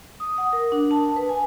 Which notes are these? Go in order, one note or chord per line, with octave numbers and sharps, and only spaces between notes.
D#6
F#5
A#4
D4
A5
B4
G#5